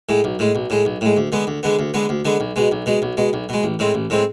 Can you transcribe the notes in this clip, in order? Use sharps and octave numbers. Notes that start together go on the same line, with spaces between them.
A2 G#3
B1
A2 G#3
B1
A2 G#3
B1
A2 G#3
D2
D3 G#3 B3
D2
D3 G#3 B3
D2
D3 G#3 B3
D2
D3 G#3 B3
B1
B2 G#3
B1
B2 G#3
B1
B2 G#3
B1
B2 G#3
A1
A2 G#3 C4
A1
A2 G#3 C4